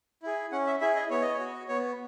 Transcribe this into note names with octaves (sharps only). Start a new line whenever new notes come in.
E4 G#4
C#4 F#5
E5
E4 G#4 E5
D#5
B3 C#5
D#5
C#5
F#4
B3 C#5